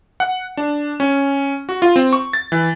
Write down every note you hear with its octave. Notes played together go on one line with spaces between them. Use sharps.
F#5
D4
C#4
F#4
F4
C4
C#6
A6
E3